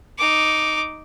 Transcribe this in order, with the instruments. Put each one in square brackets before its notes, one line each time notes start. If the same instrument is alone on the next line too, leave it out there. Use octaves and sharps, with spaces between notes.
[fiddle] D#4 D6